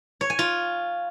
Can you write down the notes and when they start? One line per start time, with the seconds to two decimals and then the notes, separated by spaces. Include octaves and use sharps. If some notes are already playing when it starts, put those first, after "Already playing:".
0.21 C#5
0.30 G#5
0.39 F4